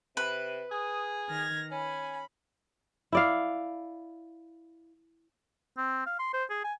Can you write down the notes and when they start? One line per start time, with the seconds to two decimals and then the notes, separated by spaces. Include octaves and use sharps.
0.17 C3 B4
0.72 G#4 D#6
1.27 D#3 F6 G#6 A#6
1.71 C#4 G#5 B5
3.12 E4 D5 F5
5.78 C4
6.06 F5
6.19 C6
6.34 C5
6.50 G#4
6.64 G#5